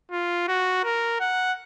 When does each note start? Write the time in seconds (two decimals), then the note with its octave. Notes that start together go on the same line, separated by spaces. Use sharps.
0.11 F4
0.48 F#4
0.84 A#4
1.20 F#5